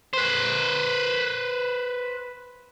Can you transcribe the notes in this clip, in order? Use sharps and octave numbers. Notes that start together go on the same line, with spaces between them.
B4 C5